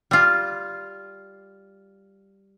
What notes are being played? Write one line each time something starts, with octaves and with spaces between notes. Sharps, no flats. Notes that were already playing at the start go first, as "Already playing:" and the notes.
G3 F4